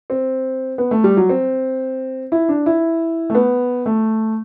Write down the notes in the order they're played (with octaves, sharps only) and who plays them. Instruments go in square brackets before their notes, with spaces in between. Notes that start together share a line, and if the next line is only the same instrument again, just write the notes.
[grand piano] C4
B3
A3
G3
F#3
C4
E4
D4
E4
A3
B3
A3